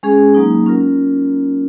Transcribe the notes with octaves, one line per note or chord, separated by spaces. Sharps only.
G#3 C#4 G#4
F#3 A#3 D#4
C#4 F4 A#4